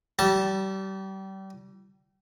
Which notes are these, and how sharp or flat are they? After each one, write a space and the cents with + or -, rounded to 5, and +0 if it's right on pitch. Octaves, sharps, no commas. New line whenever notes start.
G3 -30 A5 +0